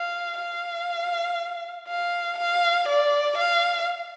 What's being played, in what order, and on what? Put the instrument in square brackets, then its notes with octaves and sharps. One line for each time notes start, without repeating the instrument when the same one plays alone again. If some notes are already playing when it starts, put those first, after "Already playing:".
Already playing: [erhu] F5
F5
F5
F5
D5
F5